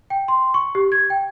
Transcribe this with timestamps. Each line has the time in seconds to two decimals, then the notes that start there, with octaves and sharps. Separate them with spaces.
0.10 G5
0.28 C6
0.54 C#6
0.75 G4
0.92 G#6
1.10 G5